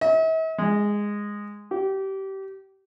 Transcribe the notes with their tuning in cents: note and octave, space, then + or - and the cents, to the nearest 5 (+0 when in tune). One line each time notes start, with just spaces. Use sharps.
E5 -45
G#3 -10
G4 -25